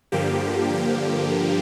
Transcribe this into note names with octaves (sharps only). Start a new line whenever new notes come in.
G2 D3 F3 A#3 G4
G4